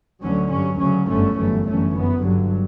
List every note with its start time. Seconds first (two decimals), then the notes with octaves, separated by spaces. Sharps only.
0.22 D2 D3 F#3 C#4
0.50 G2 F#3 C#4
0.79 D2 C#3 F#3 C#4
1.09 G1 F#2 D3 A3 C#4
1.37 G1 F#2 E3 A3
1.66 G1 F#2 E3 A3 C#4
1.94 F#2 E3 B3
2.23 G1 G2 D3 F#3